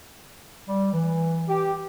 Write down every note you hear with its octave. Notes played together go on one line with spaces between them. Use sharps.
G3
E3
G4